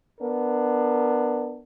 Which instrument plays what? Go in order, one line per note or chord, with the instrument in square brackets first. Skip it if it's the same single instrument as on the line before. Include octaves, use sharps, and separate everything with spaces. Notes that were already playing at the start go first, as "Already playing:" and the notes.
[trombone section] B3 D4 A#4